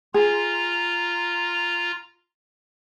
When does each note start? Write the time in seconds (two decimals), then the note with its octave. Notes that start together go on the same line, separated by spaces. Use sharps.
0.14 F4 G#4 A#5